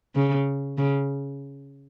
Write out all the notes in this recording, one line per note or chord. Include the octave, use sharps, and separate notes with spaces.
C#3
C#3